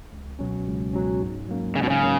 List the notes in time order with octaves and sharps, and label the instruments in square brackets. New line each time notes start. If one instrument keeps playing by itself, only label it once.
[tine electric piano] C#2
B2 F#3 C#4
C#2
B2 F#3 C#4
G#2
F#3 A#3 C#4
[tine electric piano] G#2 [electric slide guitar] C#3
[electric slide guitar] B2
C#3
[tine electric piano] F#3 A#3 C#4